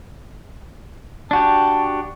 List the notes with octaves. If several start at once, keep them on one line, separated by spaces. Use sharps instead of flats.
D4 F#4 G4 A5